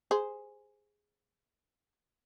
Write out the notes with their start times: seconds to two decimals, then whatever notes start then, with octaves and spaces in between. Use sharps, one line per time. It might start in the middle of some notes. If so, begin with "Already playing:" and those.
0.11 G#4 C5